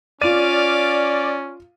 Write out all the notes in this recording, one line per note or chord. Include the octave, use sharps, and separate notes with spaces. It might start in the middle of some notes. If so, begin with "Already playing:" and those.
C#4 F4 D5 F5 D6 D#7